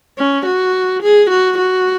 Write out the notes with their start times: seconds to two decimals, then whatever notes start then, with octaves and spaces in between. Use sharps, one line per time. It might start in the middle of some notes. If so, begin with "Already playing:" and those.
0.18 C#4
0.46 F#4
1.03 G#4
1.30 F#4
1.58 F#4